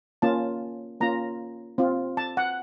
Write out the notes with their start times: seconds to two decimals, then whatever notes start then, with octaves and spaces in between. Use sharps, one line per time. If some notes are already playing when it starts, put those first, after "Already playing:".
0.22 A#3 C#4 F4 A5
1.01 A#3 C#4 F4 A#5
1.78 C4 F4
2.17 A5
2.37 F#5